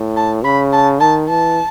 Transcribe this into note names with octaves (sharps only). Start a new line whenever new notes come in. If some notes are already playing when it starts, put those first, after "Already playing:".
Already playing: A2
A5
C#3 B5
A5
D#3 A5
E3 A5